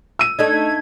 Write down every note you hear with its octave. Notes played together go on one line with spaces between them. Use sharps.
E6 D#7
A3 D4 D#4 G#6